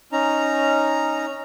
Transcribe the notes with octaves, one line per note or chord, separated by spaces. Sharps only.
C#4 D#4 A#5